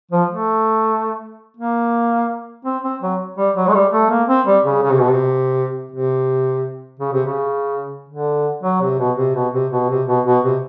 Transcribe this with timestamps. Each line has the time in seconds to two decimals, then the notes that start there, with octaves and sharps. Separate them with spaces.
0.11 F3
0.29 A3
1.57 A#3
2.65 C4
2.83 C4
3.01 F#3
3.37 G3
3.56 F#3
3.68 G#3
3.74 G3
3.92 A3
4.10 A#3
4.28 C4
4.46 G3
4.65 C#3
4.82 C#3
4.91 C3
5.00 B2
5.10 C3
5.91 C3
7.00 C#3
7.13 C3
7.26 C#3
8.09 D3
8.63 F#3
8.81 C3
8.99 B2
9.17 C3
9.35 B2
9.54 C3
9.72 B2
9.90 C3
10.08 B2
10.26 B2
10.44 C3